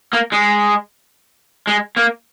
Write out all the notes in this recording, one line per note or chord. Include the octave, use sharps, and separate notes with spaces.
A#3
G#3
G#3
A#3